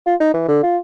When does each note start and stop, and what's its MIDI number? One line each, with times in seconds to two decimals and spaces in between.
0.06 0.15 65
0.20 0.32 63
0.34 0.47 52
0.48 0.58 50
0.63 0.78 65